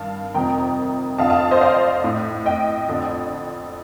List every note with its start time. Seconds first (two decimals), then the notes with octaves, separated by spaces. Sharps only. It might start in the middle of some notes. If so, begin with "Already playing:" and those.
Already playing: G2 D#3 F5 A5
0.34 F2 C3 D#3 G5 A#5
1.19 F2 D3 F5 A5
1.30 F5 A5
1.51 C5 D#5
1.61 D5 F5
2.04 A2
2.46 D#5 G5
2.88 F2 D3